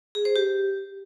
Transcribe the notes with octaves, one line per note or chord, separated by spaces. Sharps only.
G#4
C5
G4